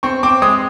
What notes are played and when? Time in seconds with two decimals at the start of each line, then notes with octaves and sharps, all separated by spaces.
0.03 C4 C#6
0.23 C4 D6
0.42 G#3 D#6